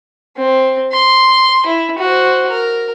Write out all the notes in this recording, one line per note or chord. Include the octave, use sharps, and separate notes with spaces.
C4
C6
E4
F#4 C5
A#4